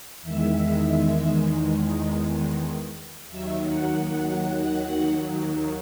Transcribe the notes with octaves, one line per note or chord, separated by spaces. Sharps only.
E2 D#3 G#3 E5
D#2 D#3 F#3 E5
F#5
F#5